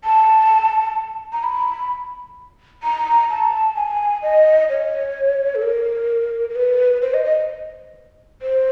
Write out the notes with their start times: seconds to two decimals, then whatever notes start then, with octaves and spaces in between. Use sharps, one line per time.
0.04 A5
1.33 A#5
1.43 B5
2.83 A#5
3.30 A5
3.76 G#5
4.22 D#5
4.69 C#5
5.55 A4
5.62 A#4
6.50 A#4
6.56 B4
7.02 C5
7.14 D#5
7.25 D#5
8.42 C5